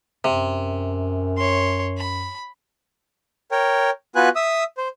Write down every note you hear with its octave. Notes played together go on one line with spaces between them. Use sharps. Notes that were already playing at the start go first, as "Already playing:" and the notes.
F#2 C3
C#5 C6
B5
A#4 C#5 G5
B3 F4 F#4 B4 G#5 F#6
E5 D#6 E6
C5